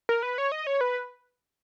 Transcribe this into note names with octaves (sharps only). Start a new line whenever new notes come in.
A#4
B4
C#5
D#5
C#5
B4